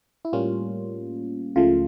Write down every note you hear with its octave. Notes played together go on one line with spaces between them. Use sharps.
E4
A2 G3 A#3 C#4 F4
C#2 C#3 F3 A3 F4